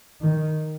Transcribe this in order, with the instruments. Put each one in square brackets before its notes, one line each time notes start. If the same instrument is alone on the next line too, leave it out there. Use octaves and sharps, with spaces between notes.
[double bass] D#3